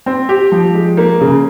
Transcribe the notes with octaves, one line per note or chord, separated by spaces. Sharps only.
C4
G4
F3
G#3
A#3
C#3